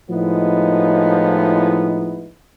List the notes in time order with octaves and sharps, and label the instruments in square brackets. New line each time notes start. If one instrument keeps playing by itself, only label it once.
[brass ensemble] A2 F3 G#3 B3 D#4 E4